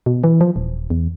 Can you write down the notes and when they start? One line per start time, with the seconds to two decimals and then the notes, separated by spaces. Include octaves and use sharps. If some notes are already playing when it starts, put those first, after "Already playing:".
0.06 B2
0.24 E3
0.41 F3
0.56 D#1
0.90 E2